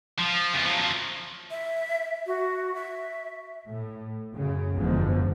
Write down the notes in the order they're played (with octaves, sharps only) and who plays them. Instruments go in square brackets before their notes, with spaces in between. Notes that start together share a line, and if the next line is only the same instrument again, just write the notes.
[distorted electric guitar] F3
E2 C#3
F3 F#3
[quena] E5
F#4
E5
[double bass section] A2
F#2 C#3
F#1 E2 G#2 D3 F3